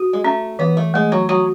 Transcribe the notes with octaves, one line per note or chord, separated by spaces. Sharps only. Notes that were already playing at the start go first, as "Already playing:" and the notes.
Already playing: F#4
G#3
A3 C#4
E3 B3
A3
G#3 A3
F#3
F#3 F#4